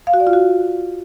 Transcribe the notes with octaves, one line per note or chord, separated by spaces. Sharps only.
F5
F#4
D5
F4
F#4